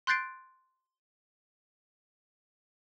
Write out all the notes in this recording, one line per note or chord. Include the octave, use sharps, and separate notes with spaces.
C6 F#6 G6 A6 C7 D7